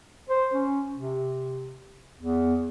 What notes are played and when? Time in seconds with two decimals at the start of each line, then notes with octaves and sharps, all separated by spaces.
0.29 C5
0.54 C#4
0.94 C3
2.18 E2